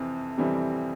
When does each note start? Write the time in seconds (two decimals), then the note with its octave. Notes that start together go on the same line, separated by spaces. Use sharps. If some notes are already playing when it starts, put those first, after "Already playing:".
Already playing: F2 C3 E3 C4
0.38 F2 C3 E3 G3 C4